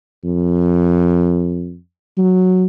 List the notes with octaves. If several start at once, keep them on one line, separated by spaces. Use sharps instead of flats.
F2
F#3